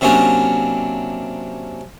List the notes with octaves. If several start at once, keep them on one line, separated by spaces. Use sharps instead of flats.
C3 F#3 A#3 C#4 D4